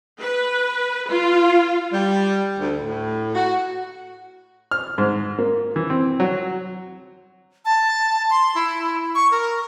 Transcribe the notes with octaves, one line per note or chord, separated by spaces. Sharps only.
B4
F4
G3
D2
A2
F#4
F6
G#2
A#3
E3
C4
F#3
A5
C6
E4
C#6
A#4